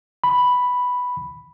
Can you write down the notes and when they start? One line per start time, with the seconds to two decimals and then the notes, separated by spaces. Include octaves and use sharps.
0.24 B5